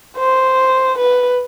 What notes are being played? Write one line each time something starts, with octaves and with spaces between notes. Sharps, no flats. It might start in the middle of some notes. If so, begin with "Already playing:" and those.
C5
B4